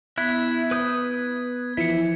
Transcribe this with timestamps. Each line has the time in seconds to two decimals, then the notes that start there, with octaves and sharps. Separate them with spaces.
0.18 B3 E4 E5 F#6 G#6 B6
0.71 B4 D#6 G6
1.77 E3 F3 E4 B6 C#7